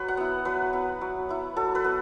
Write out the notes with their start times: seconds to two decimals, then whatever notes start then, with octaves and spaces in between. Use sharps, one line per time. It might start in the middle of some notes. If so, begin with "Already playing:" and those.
Already playing: F#3 B4
0.08 F#5
0.17 B3 E4
0.45 F#3 B4
0.73 B3 E4
1.01 F#3
1.29 B3 E4
1.56 F#3 A4
1.75 B4
1.84 B3